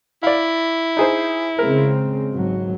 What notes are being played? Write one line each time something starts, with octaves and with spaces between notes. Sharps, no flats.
E4 D5 F5
D#4 G#4 C5
C#3 G#3 C4 A#4
G#1 G#2 F#3